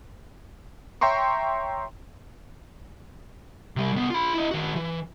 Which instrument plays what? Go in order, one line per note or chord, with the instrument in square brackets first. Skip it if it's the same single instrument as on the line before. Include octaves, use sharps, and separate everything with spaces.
[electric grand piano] C#5 E5 G5 A#5 C6 C#6
[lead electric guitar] C3 G3
C2 B3
F4 B5
E4 D#5
D#3 F#4
E3